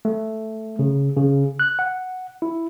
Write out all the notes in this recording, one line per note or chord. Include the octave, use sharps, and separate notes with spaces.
A3
C#3
C#3
F#6
F#5
E4